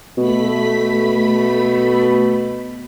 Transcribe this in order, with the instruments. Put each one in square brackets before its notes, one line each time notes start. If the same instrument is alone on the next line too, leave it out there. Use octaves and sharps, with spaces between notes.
[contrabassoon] B2 [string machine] A3 B5 B6